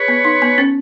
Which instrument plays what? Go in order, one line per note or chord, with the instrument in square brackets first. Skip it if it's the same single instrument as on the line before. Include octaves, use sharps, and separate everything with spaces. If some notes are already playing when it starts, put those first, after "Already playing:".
Already playing: [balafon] G#4 [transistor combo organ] B4 C#5
[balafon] B3
D#4
B3
C#4